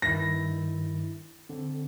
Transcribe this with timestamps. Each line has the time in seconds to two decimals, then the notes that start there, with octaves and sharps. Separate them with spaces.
0.02 G2 D#3 E4 A#6
1.49 D3 C4